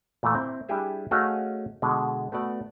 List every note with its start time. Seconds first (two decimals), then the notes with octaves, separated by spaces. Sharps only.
0.23 A#2 E3 A3
0.35 C4 E4
0.69 G3 D4 E4 G4 G#4 E5
1.11 A3 C#4 F#4 G#4 D#5 F5
1.82 B2 D3 G#3
2.32 A3 B3 F#4 D5